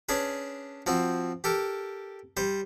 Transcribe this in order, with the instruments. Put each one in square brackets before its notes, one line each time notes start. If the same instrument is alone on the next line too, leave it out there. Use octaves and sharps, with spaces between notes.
[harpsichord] C#4 D4 G#4 B4
F3 C4 F#4
G4 A4 A#4
G3 C5